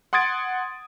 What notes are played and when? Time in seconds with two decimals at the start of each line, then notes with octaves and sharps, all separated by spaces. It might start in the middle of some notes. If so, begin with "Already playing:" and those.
0.13 F#5 C6 D#6 G#6 A6 D7